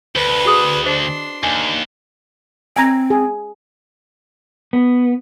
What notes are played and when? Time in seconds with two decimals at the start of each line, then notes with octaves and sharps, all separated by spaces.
0.16 D2 B4
0.45 F#4 G#4 D#6
0.86 D4 C5 D#5 C6
1.43 D#2 D4 G#5
2.76 C4 G#5 A#5
3.10 G#4
4.73 B3